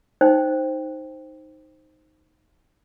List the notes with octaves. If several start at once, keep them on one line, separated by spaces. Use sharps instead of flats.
D#4 C5 G5